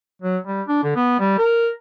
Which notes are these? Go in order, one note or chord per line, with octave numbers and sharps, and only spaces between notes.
F#3
G3
D4
D3
B3
G3
A#4